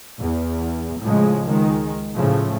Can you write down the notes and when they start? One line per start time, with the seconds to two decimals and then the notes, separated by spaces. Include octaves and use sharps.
0.21 E2
1.02 A2 C#3 F3 G#3
1.45 C#2 D#3 G#3
2.14 A2 C#3 F3 A3